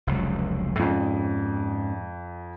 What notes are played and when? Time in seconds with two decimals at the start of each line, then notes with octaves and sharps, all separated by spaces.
0.07 F1 C#2 F#3
0.79 F2 G#2 C#4